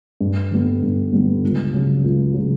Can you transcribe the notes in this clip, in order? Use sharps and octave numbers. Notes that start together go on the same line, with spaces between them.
G2
D3 G3 B3
G2
D3 G3 B3
C#2
C#3 F#3
C#2
F#3
C#3